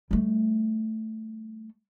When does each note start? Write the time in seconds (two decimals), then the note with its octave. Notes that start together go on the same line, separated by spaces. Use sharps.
0.11 G3 A3